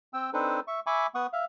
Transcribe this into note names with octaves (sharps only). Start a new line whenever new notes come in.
C4 G5 E6
C4 D4 D#4 A4 B4 C5
E5 C#6
E5 G#5 B5 C#6 D6
B3 F#5 C#6 D#6
E5 F5